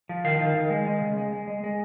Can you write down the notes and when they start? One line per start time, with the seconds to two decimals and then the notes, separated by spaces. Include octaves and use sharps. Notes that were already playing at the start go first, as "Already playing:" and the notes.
0.09 F3
0.24 D#3 F5
0.39 D#3
0.55 D#3
0.70 G#3
0.87 G#3
1.01 C#3
1.18 G#3
1.32 G#3
1.48 G#3
1.64 G#3